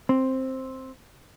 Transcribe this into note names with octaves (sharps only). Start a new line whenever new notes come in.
C4